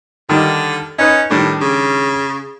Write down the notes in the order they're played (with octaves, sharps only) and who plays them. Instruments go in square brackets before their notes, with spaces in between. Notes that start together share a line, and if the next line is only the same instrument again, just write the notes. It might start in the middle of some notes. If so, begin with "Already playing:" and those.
[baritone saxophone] D3 [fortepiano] D#3 G3 D#5
[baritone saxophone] C#4 [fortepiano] D#4 B4 D#5
[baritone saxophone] A2 [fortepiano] D#3 G3 D4
[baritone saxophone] C#3